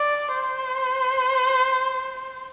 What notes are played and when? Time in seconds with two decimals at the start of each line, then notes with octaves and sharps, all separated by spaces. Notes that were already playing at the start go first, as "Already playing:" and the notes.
Already playing: D5
0.34 C5